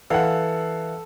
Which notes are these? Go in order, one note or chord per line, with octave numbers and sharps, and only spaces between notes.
E3 A4 F5 F#5